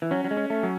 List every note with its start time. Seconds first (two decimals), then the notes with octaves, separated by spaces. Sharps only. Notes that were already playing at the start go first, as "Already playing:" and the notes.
0.02 E3
0.11 F#3 C#4
0.24 F#3
0.31 G#3
0.37 C#4
0.50 A3
0.63 F#3